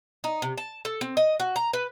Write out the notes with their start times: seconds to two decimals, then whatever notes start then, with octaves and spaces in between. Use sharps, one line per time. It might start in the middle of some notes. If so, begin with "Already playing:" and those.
0.24 D#4
0.42 C3
0.58 A5
0.85 A4
1.01 C4
1.17 D#5
1.40 F#4
1.56 A#5
1.73 B4